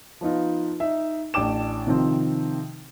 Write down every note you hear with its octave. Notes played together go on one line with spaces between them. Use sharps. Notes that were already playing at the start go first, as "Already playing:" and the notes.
F3 B3 D#4 F4
D#4 E5
A1 D4 G5 D6 E7
C3 D#3 F3 C4